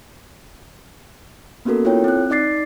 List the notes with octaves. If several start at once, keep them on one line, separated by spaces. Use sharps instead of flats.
A#3 B3 C#4 F#4 A4 A#4
E4 F4 A4 C#5 G5
C4 F#6
D#4 D5 D6 A6 C7